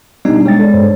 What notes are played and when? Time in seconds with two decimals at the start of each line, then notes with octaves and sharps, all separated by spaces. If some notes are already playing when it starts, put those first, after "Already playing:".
0.25 B2 G3 B3 D4 D#4
0.45 G#3 C#5 G5 A6
0.59 A4 D5
0.74 G2 C5 C#5